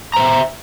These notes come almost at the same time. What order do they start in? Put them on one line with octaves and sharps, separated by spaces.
A#5 C5 E5